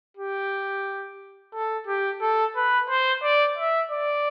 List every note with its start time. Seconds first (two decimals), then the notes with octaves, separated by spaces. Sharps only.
0.17 G4
1.54 A4
1.87 G4
2.21 A4
2.56 B4
2.89 C5
3.23 D5
3.58 E5
3.91 D5